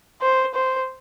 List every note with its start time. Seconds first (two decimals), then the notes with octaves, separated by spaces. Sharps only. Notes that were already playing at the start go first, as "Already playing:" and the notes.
0.22 C5
0.55 C5